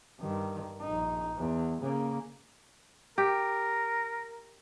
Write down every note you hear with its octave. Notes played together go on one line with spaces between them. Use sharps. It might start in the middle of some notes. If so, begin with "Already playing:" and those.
G2 D#3
A#1 D#4
E2
C#3 A#3
G4 A#4